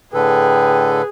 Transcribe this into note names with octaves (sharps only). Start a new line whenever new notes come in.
A2 D3 G#4 A4 B4 G5